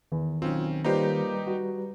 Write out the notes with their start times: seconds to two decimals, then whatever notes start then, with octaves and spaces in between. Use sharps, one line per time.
0.12 E2 D#3
0.42 B1 C4 C#4 F4
0.84 G3 A#3 D#4 F4 G4 B4 C5 A#5
1.47 F#4